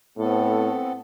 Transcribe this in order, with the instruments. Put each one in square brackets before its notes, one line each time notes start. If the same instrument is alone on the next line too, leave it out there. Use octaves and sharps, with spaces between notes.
[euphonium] A2 [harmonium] B3 C4 A4